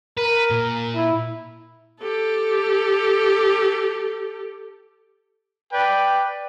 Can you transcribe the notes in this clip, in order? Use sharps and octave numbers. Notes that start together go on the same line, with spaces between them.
A#4 B4
A#2
E4
G4 A4
B4 D5 G5